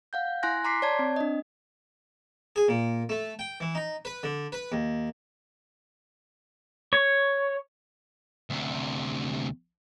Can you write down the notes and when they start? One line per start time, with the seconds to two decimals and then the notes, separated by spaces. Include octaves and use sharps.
0.13 F5 F#5 G6
0.43 E4 G#5 C6 F#6 A#6
0.64 A#5 C6 D6 B6 C7
0.82 C#5 D5 A5 G#6
0.99 C4
1.16 D4 D#5
2.56 G#4
2.68 A#2
3.09 A3
3.39 G5
3.60 E3
3.75 D#4
4.05 B4
4.23 D3
4.52 B4
4.72 D#2
6.93 C#5
8.50 D2 C3